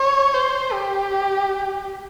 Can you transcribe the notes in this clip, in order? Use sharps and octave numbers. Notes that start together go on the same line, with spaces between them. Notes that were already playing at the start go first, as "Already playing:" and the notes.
Already playing: C#5
C5
G4